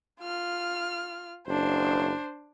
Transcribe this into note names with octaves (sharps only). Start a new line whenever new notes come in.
F4 F6
F#1 D4 C5